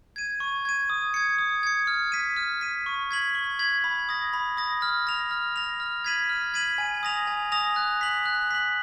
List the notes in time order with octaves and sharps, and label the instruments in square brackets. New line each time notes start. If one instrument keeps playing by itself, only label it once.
[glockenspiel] G#6 D#7
C#6
G#6 D#7
D#6
G#6 C#7
D#6
G#6 C#7
F6
B6 D#7
F6
B6 D#7
C#6
G#6 B6 F#7
C#6
G#6 B6 F#7
B5
D#6 A#6
B5
D#6 A#6
F6
A#6 F7
F6
A#6 F7
F6
G#6 B6 D#7 F#7
F6
G#6 B6 D#7 F#7
G#5
D#6 A#6 F7
G#5
D#6 A#6 F7
F#6
B6 F#7
F#6
B6 F#7